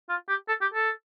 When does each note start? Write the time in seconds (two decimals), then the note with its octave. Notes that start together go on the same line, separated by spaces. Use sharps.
0.09 F4
0.28 G4
0.48 A4
0.61 G4
0.74 A4